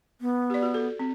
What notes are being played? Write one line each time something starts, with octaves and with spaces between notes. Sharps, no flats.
B3
G4 D5
F#4
A4
C4